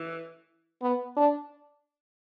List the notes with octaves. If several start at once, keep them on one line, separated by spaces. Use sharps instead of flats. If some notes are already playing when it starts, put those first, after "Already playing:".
Already playing: E3
B3
D4